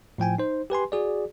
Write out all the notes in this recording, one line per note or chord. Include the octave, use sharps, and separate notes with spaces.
A2 F3 G5 G#5
D#4 C5
G4 B4 G#5 C6
F#4 G#4 D5